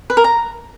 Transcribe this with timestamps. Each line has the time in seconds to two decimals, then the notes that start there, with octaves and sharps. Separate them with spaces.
0.10 B4
0.17 A#4
0.24 A#5